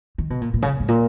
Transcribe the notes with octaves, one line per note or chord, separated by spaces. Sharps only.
D#3
B2
A#2
A#2
C#3
G#2
A#2